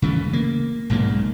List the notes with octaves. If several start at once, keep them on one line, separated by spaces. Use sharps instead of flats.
C#3 E3 A3
A#3
B1 G#2 C#3 A#3